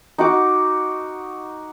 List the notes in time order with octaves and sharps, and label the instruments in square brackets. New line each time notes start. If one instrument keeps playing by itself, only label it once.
[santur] D#4 F#4 D6